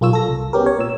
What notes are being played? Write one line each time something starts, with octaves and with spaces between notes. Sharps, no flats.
B1 A#3 F4 C#5 E6
A4 A#6
C2
B3 C#4 G4 A#4
C#5
A#2 E6